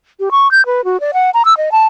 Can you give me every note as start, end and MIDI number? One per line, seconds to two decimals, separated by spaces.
0.20 0.29 67
0.31 0.50 85
0.51 0.65 91
0.66 0.84 71
0.84 1.00 66
1.00 1.11 74
1.14 1.30 78
1.34 1.42 82
1.45 1.56 88
1.57 1.69 75
1.72 1.87 81